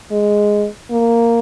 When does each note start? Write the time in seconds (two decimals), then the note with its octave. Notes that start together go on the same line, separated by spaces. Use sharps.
0.12 G#3
0.91 A#3